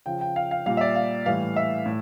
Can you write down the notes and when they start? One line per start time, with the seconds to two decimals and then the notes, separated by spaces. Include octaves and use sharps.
0.06 C#3 F3 G5
0.21 G5
0.36 F5
0.51 F5
0.66 A#2 G3 F5
0.77 E5
0.81 D5
0.95 F5
1.26 A2 E3 G3 F5
1.56 E5
1.86 A2